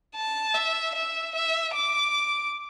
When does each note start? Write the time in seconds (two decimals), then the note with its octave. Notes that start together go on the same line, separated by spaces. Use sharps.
0.16 A5
0.55 E5
0.94 E5
1.35 E5
1.75 D6